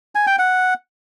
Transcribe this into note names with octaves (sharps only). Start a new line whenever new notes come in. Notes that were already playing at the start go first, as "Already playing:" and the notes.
G#5
G5
F#5